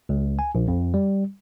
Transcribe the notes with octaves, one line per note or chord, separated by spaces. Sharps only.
C#2
G#5
A#1
F2
G3